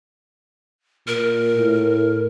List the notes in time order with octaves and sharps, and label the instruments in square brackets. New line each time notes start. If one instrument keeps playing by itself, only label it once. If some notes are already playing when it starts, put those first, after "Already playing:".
[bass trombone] A#2 [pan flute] A#4
[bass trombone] A2